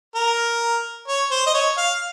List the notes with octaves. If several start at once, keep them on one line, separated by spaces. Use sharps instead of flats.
A#4
C#5
C5
D#5
C#5
F5